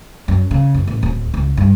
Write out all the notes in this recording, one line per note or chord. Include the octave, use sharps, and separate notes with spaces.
F#2
C#3
F#2
A1
D1
C#2
G2